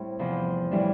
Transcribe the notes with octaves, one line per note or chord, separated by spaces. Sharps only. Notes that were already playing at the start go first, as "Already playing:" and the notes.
Already playing: A2 G3 C4 D4 E4
E2 C3 F3
A2 E3 G3 D4